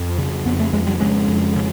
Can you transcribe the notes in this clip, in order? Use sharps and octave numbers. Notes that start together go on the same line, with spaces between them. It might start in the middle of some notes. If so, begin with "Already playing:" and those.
Already playing: F2
C#3
F2 B3
A3
F2 G#3
G3
C#3 G#3
F2
C#3